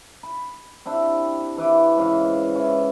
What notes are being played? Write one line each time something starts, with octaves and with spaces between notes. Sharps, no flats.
B5
C4 D4 E4 G4
E3 E4 B4 D6
G#2 C#3 E3 F5
E3 C#4